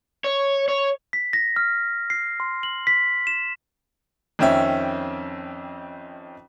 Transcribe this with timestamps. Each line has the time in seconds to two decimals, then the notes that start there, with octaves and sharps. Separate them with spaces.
0.24 C#5
0.69 C#5
1.13 B6
1.33 A#6
1.56 F6
2.10 C7
2.40 C6
2.63 F#7
2.87 B6
3.27 E7
4.39 F2 D#3 C4 C#4 E5 E6